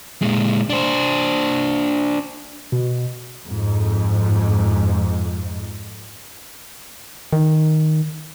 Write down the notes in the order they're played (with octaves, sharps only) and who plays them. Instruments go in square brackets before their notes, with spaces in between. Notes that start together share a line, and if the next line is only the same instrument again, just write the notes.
[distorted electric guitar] A#2 G#3
D4 C5
[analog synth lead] B2
[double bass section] F2 G#2
[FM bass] D#3